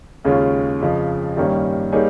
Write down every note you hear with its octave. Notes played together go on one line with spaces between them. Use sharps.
D#2 C#3 G#3 C#4 F4
F2 C#3 F3
G2 D#3 G3 A#3 C#4
G3 A#3 D#4 G#4 C#5